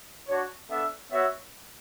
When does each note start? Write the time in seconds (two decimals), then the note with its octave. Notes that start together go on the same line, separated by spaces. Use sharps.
0.27 D4 F#4 C#5
0.69 B3 D4 A4 E5
1.11 B3 F#4 C#5 E5